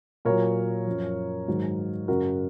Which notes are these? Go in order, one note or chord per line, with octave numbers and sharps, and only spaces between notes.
A#2 F#3 A#4 C#5
F#2 F3
G#2 D#3 F#3
F#2 C#3 F#3 F#4 A#4